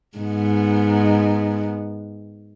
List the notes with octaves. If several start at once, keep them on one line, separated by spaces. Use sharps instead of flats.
G#2 B3